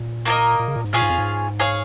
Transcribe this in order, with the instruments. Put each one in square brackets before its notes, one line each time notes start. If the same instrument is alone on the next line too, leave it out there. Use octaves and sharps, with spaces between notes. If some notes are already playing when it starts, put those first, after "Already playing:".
Already playing: [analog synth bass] A#2
[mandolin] A#3 D#4 A#4 D#5
[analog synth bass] A#2
C#3
A#2
G#2
[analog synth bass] A#2 [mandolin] C#4 F4 G#4 F5
[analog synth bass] G#2
F2
G#2
[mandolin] G#4 C#5 F5